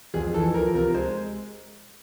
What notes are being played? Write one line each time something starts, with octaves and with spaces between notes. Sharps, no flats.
F2 G#4
E3 A4
F3 A#4
C3 A#4
G#3 C5